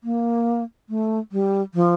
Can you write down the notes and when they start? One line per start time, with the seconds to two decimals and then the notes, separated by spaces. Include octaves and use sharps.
0.04 A#3
0.89 A3
1.32 G3
1.75 F3